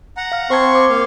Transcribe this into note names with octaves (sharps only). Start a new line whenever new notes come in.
F#5 A#5
F5 F6
C4 C5 A5 C6 C#6 G#6
D6
A#3 F5